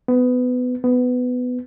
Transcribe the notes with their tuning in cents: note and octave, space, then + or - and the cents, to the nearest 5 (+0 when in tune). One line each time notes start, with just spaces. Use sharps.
B3 +20
B3 +15